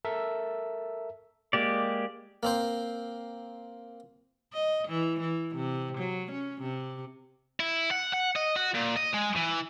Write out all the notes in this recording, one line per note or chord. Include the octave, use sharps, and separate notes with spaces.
A4 A#4 E5
G#3 A#3 G4 D5
A#3 C4 C5
D#5
E3
E3
C3
F#3
C#4
C3
E4
F#5
F#5
D#5
F#4
A#2
D#5
G#3
E3